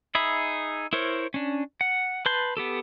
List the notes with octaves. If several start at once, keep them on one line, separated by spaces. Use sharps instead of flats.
D#4 G#4 E5 B5
E4 A#4 C5 C#5
C#4 D4
F#5
B4 A5 C6 G6
B3 G4 A4